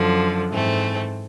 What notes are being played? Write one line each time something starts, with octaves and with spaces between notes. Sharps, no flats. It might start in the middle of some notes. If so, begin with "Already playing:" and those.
Already playing: F#2 D3 F3
G#2 E3 A3 C4